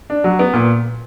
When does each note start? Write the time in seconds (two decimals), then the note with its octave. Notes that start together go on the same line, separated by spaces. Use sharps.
0.10 D4
0.24 F#3
0.39 B3
0.53 A#2